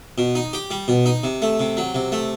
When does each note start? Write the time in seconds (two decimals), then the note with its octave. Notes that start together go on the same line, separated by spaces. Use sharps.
0.18 B2
0.35 D#4
0.53 G4
0.71 G3
0.88 B2
1.06 D#4
1.23 C3
1.42 A3
1.60 C3
1.77 F#3
1.95 C3
2.12 A3